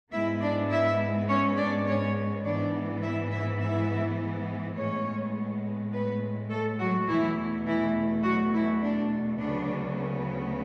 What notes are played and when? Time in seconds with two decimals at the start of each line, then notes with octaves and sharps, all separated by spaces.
0.12 G#2 G#3 B3 E4 E5
0.41 D4 D5
0.70 E4 E5
1.28 C#4 C#5
1.57 D4 D5
1.86 C#4 C#5
2.44 G#2 E3 B3 D4 D5
3.02 E4 E5
3.31 E4 E5
3.60 E4 E5
4.76 A2 G#3 B3 C#4 C#5
5.92 B3 B4
6.50 A3 A4
6.79 F#3 F#4
7.08 E2 B2 E3 A3 E4
7.66 E3 E4
8.24 F#3 F#4
8.53 E3 E4
8.82 D4
9.40 D2 C#3 F#3 B3 D4